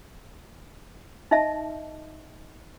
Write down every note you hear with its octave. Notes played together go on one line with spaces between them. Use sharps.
D#4 D#5 E5 A5